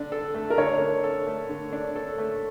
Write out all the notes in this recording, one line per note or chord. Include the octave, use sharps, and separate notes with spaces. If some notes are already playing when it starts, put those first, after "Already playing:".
Already playing: D3 D4
A4
A3
A#4
D3 C#5
D4
A4
A3
D3
D4
A4
A3